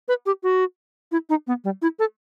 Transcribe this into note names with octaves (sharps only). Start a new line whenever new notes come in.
B4
G4
F#4
E4
D#4
B3
G3
E4
A4